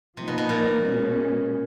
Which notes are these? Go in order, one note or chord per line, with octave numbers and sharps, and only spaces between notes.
C3 F3 A#3 D#4
B2
B2
A#2
B2 G#3 C#4